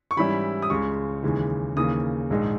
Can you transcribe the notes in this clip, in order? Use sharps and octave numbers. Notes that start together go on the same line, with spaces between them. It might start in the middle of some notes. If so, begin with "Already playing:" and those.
C#6
G#2 E3 G3 C#4 E4 B5
D#6
C#2 C#3 G#3 C#6
D#2 C#3 E3 G#3
D#2 C#3 E3 A#3 D#6
A#1 G#2 D#3 G#3 D#4